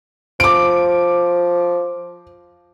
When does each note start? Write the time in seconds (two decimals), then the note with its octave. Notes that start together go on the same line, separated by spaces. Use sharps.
0.40 F3 D6 D7